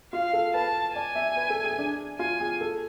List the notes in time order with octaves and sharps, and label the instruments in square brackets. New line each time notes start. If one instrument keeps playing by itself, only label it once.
[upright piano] F4 [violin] F5
[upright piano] A4
[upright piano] B4 [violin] A5
[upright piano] D5 [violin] G#5
[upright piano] E5
B4
A4
G#4
D4
[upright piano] F4 [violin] G#5
[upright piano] G#4
A4